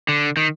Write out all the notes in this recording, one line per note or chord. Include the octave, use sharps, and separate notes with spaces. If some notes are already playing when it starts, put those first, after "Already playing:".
D3
D#3